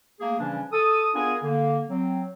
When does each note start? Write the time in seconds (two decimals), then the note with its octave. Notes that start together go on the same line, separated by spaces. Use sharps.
0.21 A3 A#3 G#4
0.39 C#3 E3 F3 G3 C#4 D4
0.72 A4 D#6
1.15 B3 D4 F4 G#4 A#4 G#5
1.42 D3 A#3
1.89 F#3 C4